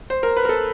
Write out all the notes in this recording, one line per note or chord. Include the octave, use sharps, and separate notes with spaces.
C5
A#4
B4
A#4
A4